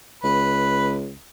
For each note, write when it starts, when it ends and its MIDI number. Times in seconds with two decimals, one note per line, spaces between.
0.23 1.14 37
0.23 0.92 71